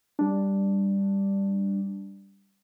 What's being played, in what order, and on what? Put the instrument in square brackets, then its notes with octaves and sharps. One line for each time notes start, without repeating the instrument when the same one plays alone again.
[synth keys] G3 D4